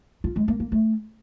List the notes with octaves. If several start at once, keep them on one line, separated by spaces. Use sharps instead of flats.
F4
G#3
A#3
A#3
A3